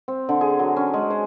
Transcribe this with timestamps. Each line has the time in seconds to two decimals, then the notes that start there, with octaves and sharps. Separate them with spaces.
0.08 C4
0.29 D3
0.41 G#4
0.59 F#3
0.76 C#4
0.94 G#3
1.10 C5